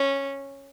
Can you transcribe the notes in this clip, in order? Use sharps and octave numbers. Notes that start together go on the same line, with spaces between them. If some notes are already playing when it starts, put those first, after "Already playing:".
Already playing: C#4